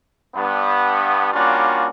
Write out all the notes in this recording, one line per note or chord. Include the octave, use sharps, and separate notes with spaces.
G2 B3
G3 A#3 C#4 D4 F4 F#4